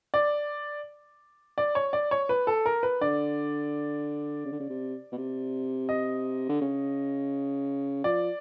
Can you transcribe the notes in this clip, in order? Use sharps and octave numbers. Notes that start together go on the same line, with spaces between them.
D5
D5
C#5
D5
C#5
B4
A4
A#4
B4
D3 D5
C#3
D3
C#3
C3
B2
C3
D#5
D3
C#3
F3 D5